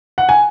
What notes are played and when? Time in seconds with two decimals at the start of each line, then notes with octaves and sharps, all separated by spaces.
0.18 F#5
0.29 G#5